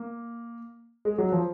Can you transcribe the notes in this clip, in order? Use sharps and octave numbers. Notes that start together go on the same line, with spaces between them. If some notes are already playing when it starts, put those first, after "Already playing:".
Already playing: A#3
G#3
F#3
F3